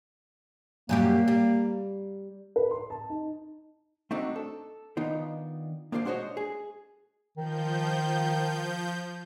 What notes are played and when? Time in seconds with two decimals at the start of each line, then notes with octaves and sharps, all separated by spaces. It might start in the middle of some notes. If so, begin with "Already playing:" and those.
0.89 F#2 G3 A#3 G4
1.28 G3
2.56 B4
2.71 C6
2.90 A5
3.10 D#4
4.11 A3 C4 D4 D#4 F#4
4.36 A4
4.97 D#3 B3 D4 D#4 F4
5.92 A#3 B3 D4 F4 C5 D5
6.05 G#3 D4 F#4 C5 C#5 D#5
6.37 G#4
7.38 D#3 F3 G6